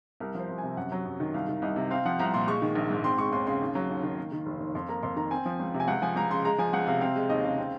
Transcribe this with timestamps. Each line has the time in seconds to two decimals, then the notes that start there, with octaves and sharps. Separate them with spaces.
0.20 C2 A#4
0.35 F3 C5
0.49 C2
0.58 C3 G#5
0.77 F#2 F#5
0.92 F#3
1.05 F#2
1.20 D#3
1.34 C2 F5
1.49 D#3
1.62 C2 D#5
1.76 C3
1.91 C4 F5
2.05 F3 F#5
2.19 C2 A#5
2.34 A#2 C6
2.47 G#3 C#6
2.62 D#3
2.75 A#1
2.90 G#2
3.04 C4 C6
3.18 G#3 C#6
3.32 D#2 C6
3.47 C#3 C6
3.62 D#2
3.75 F#3
3.90 D#2
4.03 D#3
4.18 A#3
4.32 D#3
4.46 F1
4.60 D#2
4.75 F2 C6
4.88 A#3 A#5
5.03 F2 C6
5.16 D#3 A#5
5.31 C4 G#5
5.45 F3
5.60 C#2
5.74 C3
5.80 G#5
5.88 C#2 F#5
6.02 F3 G#5
6.16 C#2 A#5
6.30 C#3 C6
6.45 G#3 A#5
6.58 F3 G#5
6.73 C#2 F#5
6.87 C3 F5
7.01 C4 F5
7.16 G#3
7.30 D#2 D#5
7.44 C#3 F5
7.58 C4